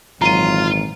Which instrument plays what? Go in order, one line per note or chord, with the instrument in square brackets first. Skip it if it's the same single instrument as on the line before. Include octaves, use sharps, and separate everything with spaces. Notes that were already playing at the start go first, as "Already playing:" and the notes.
[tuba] G#1 [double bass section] A#2 E3 F#3 [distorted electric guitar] F4 [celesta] A#5 D#7